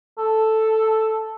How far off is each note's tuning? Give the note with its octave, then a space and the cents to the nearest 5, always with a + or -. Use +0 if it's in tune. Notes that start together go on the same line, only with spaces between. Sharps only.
A4 +0